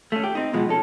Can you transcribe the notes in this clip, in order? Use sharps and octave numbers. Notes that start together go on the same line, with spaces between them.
A3 C#4
G4
C4 D#4
B2 F3 G#3 B3
C#4 A4